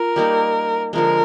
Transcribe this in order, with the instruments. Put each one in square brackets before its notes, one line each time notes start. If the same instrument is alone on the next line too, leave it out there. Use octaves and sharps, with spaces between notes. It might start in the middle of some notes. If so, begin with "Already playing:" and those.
Already playing: [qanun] F4 [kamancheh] A#4
[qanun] G3 A#3 D#4
[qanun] D3 F3 G#3 [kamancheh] A#4